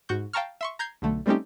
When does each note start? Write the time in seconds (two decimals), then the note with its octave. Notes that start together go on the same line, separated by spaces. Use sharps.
0.09 G#2 F#4 C#6 G6
0.33 F5 G5 A5 A#5 C#6 F6
0.61 E5 C6 C#6
0.79 A#5 G6 G#6 C7
1.02 B1 D3 A3
1.26 G3 A3 C4 C#4 D#4 G4